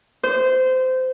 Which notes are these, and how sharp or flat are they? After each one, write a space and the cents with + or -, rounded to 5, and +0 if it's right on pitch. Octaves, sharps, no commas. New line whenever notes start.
C5 -20